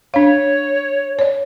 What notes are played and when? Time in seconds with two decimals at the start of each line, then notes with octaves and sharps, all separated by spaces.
0.14 D4 C#5 F5
1.19 C#5 D5